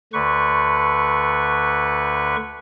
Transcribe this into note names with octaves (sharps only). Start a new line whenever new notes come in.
D2 D3 B4 C#6